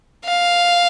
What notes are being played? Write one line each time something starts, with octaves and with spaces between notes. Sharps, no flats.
F5